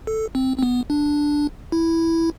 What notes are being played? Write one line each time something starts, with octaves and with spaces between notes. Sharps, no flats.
A4
C4
C4
B3
D4
E4